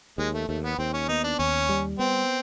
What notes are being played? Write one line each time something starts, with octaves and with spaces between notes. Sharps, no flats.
D#2 G#3
A3
D#2 A3
B3
D#2 C4
C#4
B3 D#4
D4
D#2 C#4
G3
B3 C4